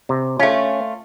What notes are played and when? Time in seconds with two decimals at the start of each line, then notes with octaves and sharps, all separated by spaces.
0.09 C3
0.39 A3 C#4 F4